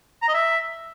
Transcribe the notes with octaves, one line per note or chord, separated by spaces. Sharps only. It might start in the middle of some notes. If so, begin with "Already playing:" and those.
A#5
D#5
E5